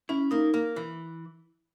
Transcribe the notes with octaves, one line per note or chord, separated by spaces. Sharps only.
C#4 E4
A#3 D#4
A#3
E3